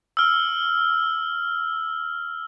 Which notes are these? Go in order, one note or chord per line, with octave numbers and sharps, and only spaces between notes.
E6 F6